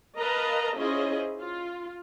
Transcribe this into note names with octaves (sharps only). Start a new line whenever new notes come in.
A#4 B4 D#5 F5 A5 A#5
C#4 E4 F4 G#4 C5 D#5
F4